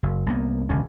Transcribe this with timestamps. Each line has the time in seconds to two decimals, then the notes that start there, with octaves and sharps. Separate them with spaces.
0.03 F#1
0.26 C2 A#3 B3
0.69 E1 C#2 D3 C#4